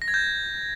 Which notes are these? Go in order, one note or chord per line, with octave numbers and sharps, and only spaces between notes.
A#6
G#6
G6